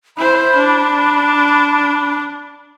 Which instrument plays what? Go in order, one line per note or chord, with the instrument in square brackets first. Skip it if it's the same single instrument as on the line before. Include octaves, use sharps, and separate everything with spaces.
[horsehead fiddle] E4 C5 [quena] B5
[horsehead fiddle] D4